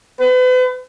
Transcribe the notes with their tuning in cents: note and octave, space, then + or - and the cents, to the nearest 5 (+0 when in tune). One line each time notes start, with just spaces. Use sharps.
B4 +40